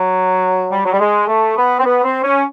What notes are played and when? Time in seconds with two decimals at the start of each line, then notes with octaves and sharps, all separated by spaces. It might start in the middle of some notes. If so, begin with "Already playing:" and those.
Already playing: F#3
0.70 G3
0.85 F#3
0.92 G3
0.99 G#3
1.27 A3
1.57 B3
1.79 C4
1.85 B3
2.04 C4
2.23 C#4